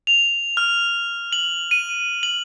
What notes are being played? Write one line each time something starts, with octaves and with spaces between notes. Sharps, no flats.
F7
F6
F#7
D#7
F#7